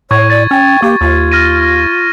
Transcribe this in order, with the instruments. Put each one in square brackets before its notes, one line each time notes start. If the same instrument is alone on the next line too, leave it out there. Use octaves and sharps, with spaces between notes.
[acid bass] A2 [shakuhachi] C#5 [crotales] C#6 G#6
[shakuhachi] D5 [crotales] A6
[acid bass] C#4 [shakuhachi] G5
[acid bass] A#3 [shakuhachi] G4
[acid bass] D#2 [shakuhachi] F4
[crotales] F6 A#6 D#7